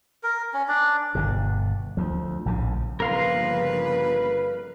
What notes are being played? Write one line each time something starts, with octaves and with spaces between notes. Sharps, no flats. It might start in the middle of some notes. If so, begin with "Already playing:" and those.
A#4
C#4
D4
G1 B2
D2 F3
A#1 A2 C#3
G1 C#3 F3 A#3 A#4 B4 F5 C6